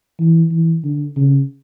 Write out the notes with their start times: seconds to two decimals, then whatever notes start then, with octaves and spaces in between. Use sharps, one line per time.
0.20 E3
0.51 E3
0.84 D3
1.17 C#3